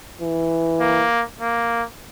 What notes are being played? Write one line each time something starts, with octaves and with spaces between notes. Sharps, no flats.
E3
A#3
A#3